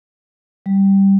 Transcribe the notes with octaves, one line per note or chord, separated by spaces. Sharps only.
G3